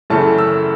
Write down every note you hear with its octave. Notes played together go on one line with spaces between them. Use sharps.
F#2 C#3 E3 A3 A5
E6